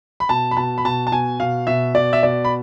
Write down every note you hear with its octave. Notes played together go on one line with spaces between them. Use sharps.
B5
B2 A5
B5
B2 A5
B5
B2 A5
A5
B2 G#5
B2 F5
B2 E5
B2 D5
E5
B2 D5
B5